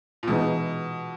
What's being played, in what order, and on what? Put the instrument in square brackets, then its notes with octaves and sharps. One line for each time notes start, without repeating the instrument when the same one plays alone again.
[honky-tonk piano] A#2
[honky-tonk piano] B2 [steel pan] E3 G#3 B3 D#4